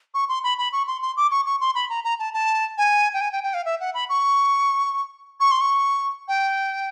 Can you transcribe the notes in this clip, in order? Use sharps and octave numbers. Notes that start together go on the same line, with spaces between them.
C#6
C6
B5
B5
C#6
C6
C6
D6
C#6
C#6
C6
B5
A#5
A#5
A5
A5
G#5
G5
G#5
G5
G5
F5
E5
F#5
B5
C#6
C#6
C6
C#6
G5